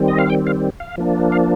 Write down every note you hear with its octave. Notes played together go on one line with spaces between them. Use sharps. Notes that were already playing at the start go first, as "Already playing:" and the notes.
Already playing: D#3 G3 C4
D#5
F5
G5
F5
F5
F3 A#3 D4
F5